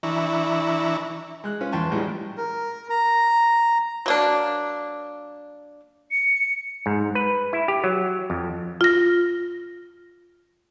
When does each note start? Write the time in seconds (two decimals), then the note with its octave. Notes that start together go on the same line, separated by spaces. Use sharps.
0.03 E3 D4 E4 A#5 C#6
1.44 G#3 F#6
1.61 C#4 F4 B4
1.72 E2 B4 G5 A5 C6 C#6
1.91 A#1 A2 G3 G#3
2.37 A#4
2.90 A#5
4.06 F#3 A#3 D4
6.11 C#7
6.86 G#2
7.15 B4
7.53 E4
7.68 G4
7.84 F#3
8.30 F2
8.81 F4 A#6